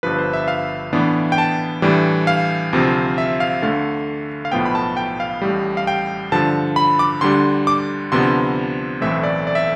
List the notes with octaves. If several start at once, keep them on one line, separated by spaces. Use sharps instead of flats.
G1 G2 F3 B4
C5
E5
F5
A2 E3 B3 D4
G5
A5
A2 E3 G3 D4
F5
D2 C3 F3 C4
E5
F5
D2 D3 A3 F5
F5
B1 A2 F3 B3 G5
B5
A5
G5
F5
A1 A2 G3
F5
G5
G2 D3 F3 A5
B5
D6
D2 D3 G3 D4 C6
D6
D2 C3 F3 B3 D4 C6
B1 A2 E3 A3 C4 E5
D5
D5
E5